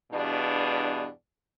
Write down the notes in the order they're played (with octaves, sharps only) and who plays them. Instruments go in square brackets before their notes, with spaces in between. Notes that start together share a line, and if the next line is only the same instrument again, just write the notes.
[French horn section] E2 G2 B2 D4